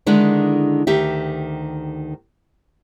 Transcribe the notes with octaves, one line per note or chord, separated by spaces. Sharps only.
D3 D#3 G#3 D4 E4
D2 D#3 G4 E5